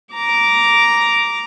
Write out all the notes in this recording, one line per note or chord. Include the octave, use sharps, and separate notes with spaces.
A#5 D6